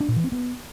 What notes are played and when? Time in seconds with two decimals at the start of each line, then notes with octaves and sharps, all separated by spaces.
0.01 D4
0.08 A#2
0.16 E3
0.24 C4
0.32 B3